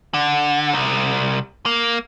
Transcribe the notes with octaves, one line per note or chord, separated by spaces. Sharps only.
D3
C2
A#3